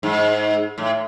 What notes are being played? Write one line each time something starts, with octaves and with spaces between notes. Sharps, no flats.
G#2
A2